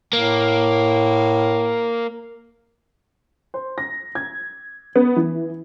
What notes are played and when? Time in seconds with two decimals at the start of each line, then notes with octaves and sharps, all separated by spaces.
0.13 A2 A#3
3.54 C5
3.78 A#6
4.15 G#6
4.96 B3
5.16 E3